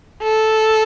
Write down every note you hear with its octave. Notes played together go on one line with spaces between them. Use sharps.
A4